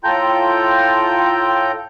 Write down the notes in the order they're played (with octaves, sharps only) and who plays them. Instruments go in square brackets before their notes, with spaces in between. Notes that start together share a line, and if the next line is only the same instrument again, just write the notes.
[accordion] A2 F4 A4 G5 A#5 G6